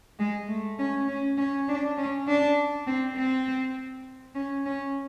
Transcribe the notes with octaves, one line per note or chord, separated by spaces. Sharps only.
G#3
A3
C#4
C#4
C#4
D4
C#4
D4
C4
C4
C#4
C#4